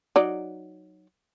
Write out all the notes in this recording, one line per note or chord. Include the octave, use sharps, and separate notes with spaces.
F#3 D#4 D5